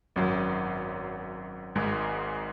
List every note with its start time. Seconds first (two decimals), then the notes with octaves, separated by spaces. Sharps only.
0.16 G#1 F#2 F#3
1.75 G#1 G#2 G#3